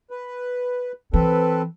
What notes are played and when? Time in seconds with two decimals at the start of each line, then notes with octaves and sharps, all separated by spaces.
0.10 B4
1.13 E3 C4 A4 B4